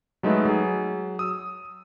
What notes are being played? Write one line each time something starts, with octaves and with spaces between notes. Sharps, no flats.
F#3 G#3 A3 D#4 B4
F#3 G#4
D#6 E6